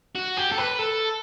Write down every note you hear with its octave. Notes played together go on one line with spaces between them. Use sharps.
F#4
G4
A4
B4
A4